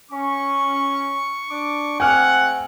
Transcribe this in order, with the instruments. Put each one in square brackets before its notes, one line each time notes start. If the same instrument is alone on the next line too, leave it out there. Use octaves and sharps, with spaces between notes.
[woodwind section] C#4 [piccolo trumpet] C#6
[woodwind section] D4 D6
[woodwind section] G#2 A3 C4 [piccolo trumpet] F#5 [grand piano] G#5 F6